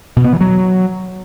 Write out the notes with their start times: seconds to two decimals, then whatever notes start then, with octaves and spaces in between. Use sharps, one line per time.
0.16 B2
0.25 B3
0.33 E3
0.41 F#3